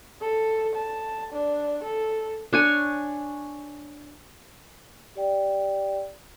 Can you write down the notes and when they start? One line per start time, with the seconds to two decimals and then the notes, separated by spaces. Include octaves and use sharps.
0.21 A4
0.75 A5
1.33 D4
1.84 A4
2.53 D4 C#5 G#5
5.15 G4 D5 G5